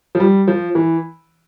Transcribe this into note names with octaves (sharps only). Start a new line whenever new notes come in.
F3
G3
F3
E3